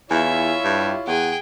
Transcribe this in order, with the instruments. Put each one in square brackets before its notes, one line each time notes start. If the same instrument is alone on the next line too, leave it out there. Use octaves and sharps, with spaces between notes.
[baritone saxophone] E2 [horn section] E4 F4 C#5 [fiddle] E5 [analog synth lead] G#5
[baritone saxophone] G2 [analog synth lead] G4
[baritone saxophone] E2 [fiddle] G#4 G5 [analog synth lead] F#5